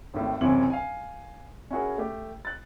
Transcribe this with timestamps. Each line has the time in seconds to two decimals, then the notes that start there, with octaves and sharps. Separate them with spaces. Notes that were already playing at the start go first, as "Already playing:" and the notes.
0.14 G#1 D#2 A2
0.41 F#1 C3 E3 C4 C#4 F#7
0.70 F5 G#5
1.71 C#4 E4 F#4 G#4 A#4
1.98 A3 G4
2.45 F#6 A6